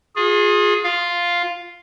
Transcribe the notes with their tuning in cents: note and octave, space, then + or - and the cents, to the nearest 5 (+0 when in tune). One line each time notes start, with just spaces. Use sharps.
F4 +35 G#4 +0
F4 +0 F5 +0